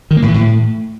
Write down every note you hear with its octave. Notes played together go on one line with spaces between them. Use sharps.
D#3
A#3
A2
E3
A2